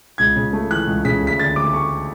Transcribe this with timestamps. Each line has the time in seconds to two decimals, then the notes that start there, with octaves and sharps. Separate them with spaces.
0.18 C#2 G#6
0.36 C#3
0.53 A3
0.70 E3 F#6
0.87 C#2
1.05 C#3 B6
1.22 D2 B6
1.39 D3 A6
1.56 D2 D6
1.73 A3 C#6